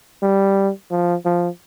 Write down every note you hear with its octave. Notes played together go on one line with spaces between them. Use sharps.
G3
F3
F3